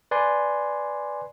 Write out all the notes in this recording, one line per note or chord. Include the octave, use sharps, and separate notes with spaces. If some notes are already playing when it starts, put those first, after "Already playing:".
B4 D5 G#5 C6